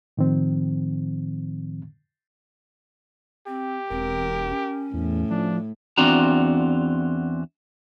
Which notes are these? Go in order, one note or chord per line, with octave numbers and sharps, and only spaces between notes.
A2 D#3 F3 C4
C4 G4
E1 C4 A#4
C#4
E2 A2
F3 D4
E2 C4 D4 F4 F#4 A#5